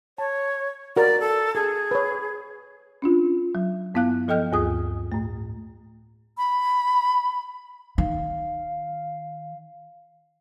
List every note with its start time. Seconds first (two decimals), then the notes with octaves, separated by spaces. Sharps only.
0.18 C#5 A5
0.96 F#4 A#4 D5
1.20 A4
1.55 G#4 A4
1.91 B4 C#5
3.02 C#4 D4 F4
3.55 F#3
3.94 G2 B3 E4 F5 F#6
4.28 F3 A4 D#5 G5 F6 G6
4.51 D2 G2 G#4 D#6
5.12 A2 A3
6.37 B5
7.98 D#3 F5